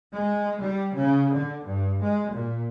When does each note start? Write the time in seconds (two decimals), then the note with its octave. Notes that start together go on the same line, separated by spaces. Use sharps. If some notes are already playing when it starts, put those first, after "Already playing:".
0.13 G#3
0.60 G3
0.95 C#3
1.34 D3
1.66 G2
2.03 G#3
2.33 A#2